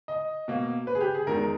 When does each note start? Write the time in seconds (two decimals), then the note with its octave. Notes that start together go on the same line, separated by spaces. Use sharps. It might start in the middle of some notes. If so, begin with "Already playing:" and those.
0.08 D#5
0.48 B2 A#3
0.87 B4
0.95 G#4
1.01 G4
1.15 G#4
1.27 E2 D#3 G#3 A#4